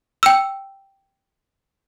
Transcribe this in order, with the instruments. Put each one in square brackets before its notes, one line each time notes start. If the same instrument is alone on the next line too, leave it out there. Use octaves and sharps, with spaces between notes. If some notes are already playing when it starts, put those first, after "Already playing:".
[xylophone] G5 E6